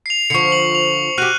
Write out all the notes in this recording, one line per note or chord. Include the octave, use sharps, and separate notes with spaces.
C7 F7
D3 F3 C#6 C7 C#7
F#7
F7
F#4 G4 F6 F#6 D#7